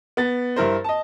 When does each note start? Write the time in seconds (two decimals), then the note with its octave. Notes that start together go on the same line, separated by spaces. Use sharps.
0.17 B3 A6
0.56 G2 E4 A#4 C5
0.84 D#5 A5